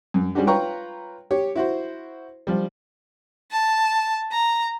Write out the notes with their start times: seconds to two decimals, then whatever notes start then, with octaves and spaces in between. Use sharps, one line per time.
0.14 F#2
0.35 G3 G#3 C#4 D4 F#4 G4
0.47 F4 B4 C#5 G5 A#5 C#6
1.31 G4 C#5
1.55 E4 F#4 C5
2.47 F3 G3
3.51 A5
4.32 A#5